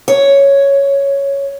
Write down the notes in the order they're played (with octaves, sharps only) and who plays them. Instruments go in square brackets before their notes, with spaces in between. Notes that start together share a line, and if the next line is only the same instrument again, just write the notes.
[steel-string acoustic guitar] C#5